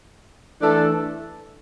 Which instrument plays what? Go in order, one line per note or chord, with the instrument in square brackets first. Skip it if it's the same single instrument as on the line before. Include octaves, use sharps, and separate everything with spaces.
[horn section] E3 A3 D4 A4